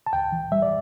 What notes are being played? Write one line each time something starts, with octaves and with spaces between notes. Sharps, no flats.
A5
D2 G5
E3
G3 E5
D5